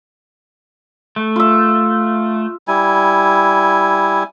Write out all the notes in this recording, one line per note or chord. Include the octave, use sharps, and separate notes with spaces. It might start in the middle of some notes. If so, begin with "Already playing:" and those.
A3
F4 E5
G3 E4 G#5